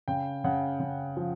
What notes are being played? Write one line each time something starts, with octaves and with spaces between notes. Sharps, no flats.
C#3 G5
C#3 F#5
C#3
F3